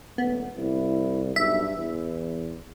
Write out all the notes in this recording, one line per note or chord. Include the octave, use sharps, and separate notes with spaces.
D#1 A3 B3
C2 E4
B1 G2 E5
E2 E3